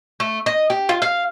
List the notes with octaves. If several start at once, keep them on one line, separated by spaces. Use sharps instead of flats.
A3
D#5
G4
F4
F5